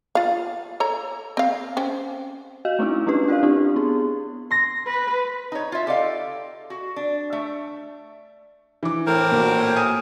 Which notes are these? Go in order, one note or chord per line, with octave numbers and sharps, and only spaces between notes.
F4 F5
A4 C#5 A#5
C4 F5
C4 C#4
F#4 D#5 F5
A3 C4 C#4 D#4 E4
A3 C#4 D4 G4 B4
F4 A#4 D5 F5
C4 D4 E4 G4
B3 G#4
C6 A#6
B4
D#4 C#5
F4 E5
G4 A4 D5 D#5 F5
F#4
D4
A3 E5
E3 D6
A2 C4 A#4
A#2 F#4
G#5 D#6 D#7